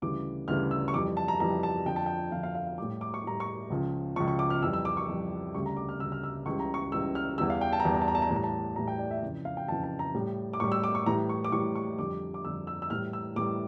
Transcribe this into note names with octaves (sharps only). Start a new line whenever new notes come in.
D2 C#3 E3 G3 D6
D2 C#3 E3 G3 F6
E6
C#6
F2 E3 G3 D6
A5
A#5
F2 E3 G3 A#5
A5
F2 D3 F3 G5
A5
G5
F2 D3 F3 F5
F5
F5
F5
A2 G3 D6
D6
C#6
A2 G3 A#5
C#6
C#2 C#3 F3
C#2 C#3 F3 C#6
C#6
D6
F6
F2 E3 G3 E6
E6
D6
C#6
F2 E3 G3
D2 C#3 G3 C#6
A#5
D6
F6
D2 C#3 G3 E6
F6
E6
C#2 C#3 E3 G3 C#6
A#5
C#6
C#2 C#3 E3 G3 E6
F6
E2 E3 G3 E6
F5
G5
A5
A#5
E2 E3 G3 A5
A#5
A5
A#5
A5
A#5
A2 E3 G3 A5
A#5
A5
A2 E3 G3 A#5
G5
D5
E5
F2 C#3 E3
F5
G5
F2 C#3 E3 A5
A5
A#5
A2 G3
D6
A2 G3 C#6
E6
D6
C#6
A2 E3 G3 A#5
C#6
D6
A2 E3 G3 C#6
C#6
F2 D3 G3 D6
D6
F2 D3 G3 E6
E6
E6
A2 E3 G3 F6
E6
A2 E3 G3 D6